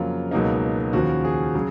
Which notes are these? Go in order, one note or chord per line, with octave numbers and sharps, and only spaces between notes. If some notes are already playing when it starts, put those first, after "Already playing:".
Already playing: F2 C#3 F#3 A#3 F4
C#2 B2 F#3 A#3 D#4
D#2 C#3 F3 F#4
G#4
C#3 F#3